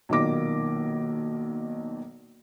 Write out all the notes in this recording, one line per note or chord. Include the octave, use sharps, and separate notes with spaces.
B1 A#2 D#3 A#3 D6 A#6